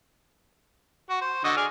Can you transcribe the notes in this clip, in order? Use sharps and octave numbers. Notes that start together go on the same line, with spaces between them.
F#4
C5
D3 F#4 D#5
G#4 D5 F6